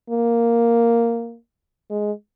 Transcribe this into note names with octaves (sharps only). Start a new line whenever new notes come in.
A#3
G#3